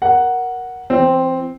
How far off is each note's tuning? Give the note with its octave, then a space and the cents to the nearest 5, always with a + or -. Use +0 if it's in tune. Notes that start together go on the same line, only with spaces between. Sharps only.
A#4 +10 F#5 +0
E3 +45 C4 +0